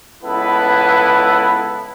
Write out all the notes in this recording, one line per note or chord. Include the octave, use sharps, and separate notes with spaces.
C#2 B3 E4 A4 B4